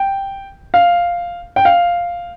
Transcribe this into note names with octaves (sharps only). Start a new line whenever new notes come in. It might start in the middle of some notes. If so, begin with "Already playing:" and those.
Already playing: G5
F5
G5
F5